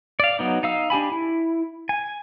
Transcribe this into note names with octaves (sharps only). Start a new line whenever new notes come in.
D5 F5
F#3 B3 D#4
D#4 F5 E6
D4 G4 G#5 B5
E4
G#5